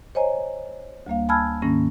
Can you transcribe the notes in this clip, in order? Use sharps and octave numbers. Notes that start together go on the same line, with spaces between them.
C5 C#5 D#5 G#5 A#5
D2 G3 A#3 F5
G#5 A5 B5 E6 F6 G#6
G#2 D#3 A#3 C#4 A#6